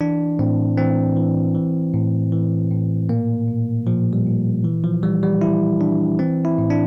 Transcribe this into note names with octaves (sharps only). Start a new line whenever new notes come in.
E3 D4
A2 C4
E3 C4
E3
E3
A2
E3
A2
A#2 A#3
A#2
A#2 F3
G3
A#2
E3
F3
E3 G3
G3
E3 E4
E3 D4
E3 C4
E4
A2
D4